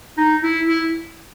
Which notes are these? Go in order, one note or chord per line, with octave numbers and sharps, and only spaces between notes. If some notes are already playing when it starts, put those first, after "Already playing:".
D#4
E4
E4